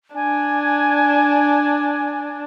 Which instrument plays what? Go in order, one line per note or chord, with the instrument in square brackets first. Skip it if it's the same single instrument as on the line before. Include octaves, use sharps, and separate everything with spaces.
[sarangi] D4 [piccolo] G#5